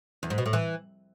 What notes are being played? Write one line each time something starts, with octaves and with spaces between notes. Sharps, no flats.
E2
G#2
B2
A2
E3